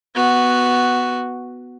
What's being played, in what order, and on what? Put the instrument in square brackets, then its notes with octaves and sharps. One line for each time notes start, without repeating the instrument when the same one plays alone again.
[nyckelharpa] B3 F#4